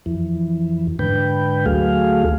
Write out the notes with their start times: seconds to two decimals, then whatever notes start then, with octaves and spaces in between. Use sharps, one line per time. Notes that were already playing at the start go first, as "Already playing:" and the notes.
0.06 F2 E3
0.99 G#2 D3 B4 G5
1.66 D2 F#3 A3 G#4 F5